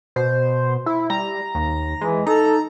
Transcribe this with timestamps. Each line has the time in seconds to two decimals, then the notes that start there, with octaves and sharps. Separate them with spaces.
0.16 B2 C5
0.86 E4
1.10 G3 A#5
1.55 D#2
2.01 E3 G#3
2.27 D#4 A4 A#5